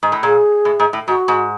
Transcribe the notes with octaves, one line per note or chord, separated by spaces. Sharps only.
G#2
A2
A#2 G#4
A2
G#2
A2
G#2 F#4
G#2